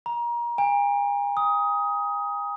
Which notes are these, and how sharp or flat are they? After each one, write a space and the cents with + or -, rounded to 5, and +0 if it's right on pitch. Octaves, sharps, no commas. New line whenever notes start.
A#5 +30
G#5 -40
D#6 +15